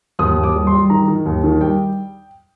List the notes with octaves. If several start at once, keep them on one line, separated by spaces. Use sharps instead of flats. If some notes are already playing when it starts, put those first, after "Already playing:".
D#2 D#6
D#2
D6
G3
C6
G3
D#3 A#5
D#3
D#2
D#3
G3 G5